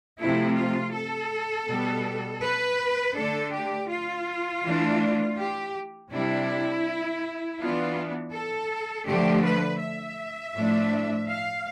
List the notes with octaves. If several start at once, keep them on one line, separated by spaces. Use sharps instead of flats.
C3 F3 A3 E4
F4
A4
B2 G3 B3
B4
D3 A3 D4 A4
G4
F4
E3 A3 D4
G4
C3 G3 D4 E4
E3 B3 D4 F4
A4
D3 F3 A3 G4
B4
E5
A2 F3 A3 D4
F5